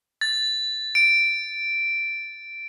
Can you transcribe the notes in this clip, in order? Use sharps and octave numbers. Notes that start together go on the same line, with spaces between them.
A6
D7